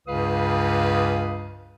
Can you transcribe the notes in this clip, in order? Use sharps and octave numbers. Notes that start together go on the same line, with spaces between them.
C#2 G2 C#3 B4 F5 D#6